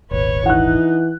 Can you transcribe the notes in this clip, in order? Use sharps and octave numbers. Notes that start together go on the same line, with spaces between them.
D#1 G#1 B4 C#5
E3 D#4 F#5 F#6